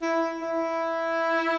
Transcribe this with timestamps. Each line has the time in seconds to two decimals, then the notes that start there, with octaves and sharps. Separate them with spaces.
0.02 E4
0.41 E4